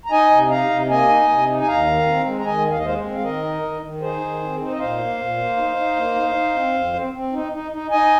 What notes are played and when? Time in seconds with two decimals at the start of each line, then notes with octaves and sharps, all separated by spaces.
0.06 A#5
0.11 D#4 D#5 G#5
0.31 C3
0.50 D#4 F5 A#5
0.70 C3
0.89 A#3 D#5 G#5
1.09 D#4
1.28 C3
1.48 D#4
1.61 G#5
1.67 D#2 F5 A#5
1.87 D#3
2.06 C4
2.26 G#3
2.39 A#5
2.45 D#3 D#5 G#5
2.65 D#2
2.71 F5
2.78 D#5
2.85 G#3 C5 F5
3.04 C4
3.14 F5
3.23 D#3 A#4 D#5
3.43 D#4
3.63 D#3
3.81 D#3
4.01 D#4 G#4 C5
4.20 D#3
4.40 C4
4.60 D#4 C5
4.72 D#5
4.79 A#2 C5 F5
4.98 A#3
5.18 A#2
5.37 A#3
5.57 D#4
5.77 D#4
5.96 A#3
6.15 D#4
6.35 D#4
6.55 C4
6.74 F2
6.93 C4
7.13 C4
7.33 D#4
7.52 D#4
7.72 D#4
7.91 D#4 D#5 G#5